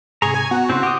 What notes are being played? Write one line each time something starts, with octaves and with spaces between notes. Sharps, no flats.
G#2 C3 G#4 A#5 C#6
G#5
B3 F#4
C#3 C4 E4 C6
G4 D#6